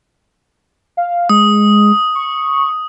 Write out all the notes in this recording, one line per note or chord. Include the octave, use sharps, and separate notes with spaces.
F5
G#3 D#6
C#6